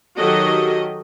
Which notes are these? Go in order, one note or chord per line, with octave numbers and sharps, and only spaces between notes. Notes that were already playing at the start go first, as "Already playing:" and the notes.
D#3 F#3 F#4 G4 A4 D#5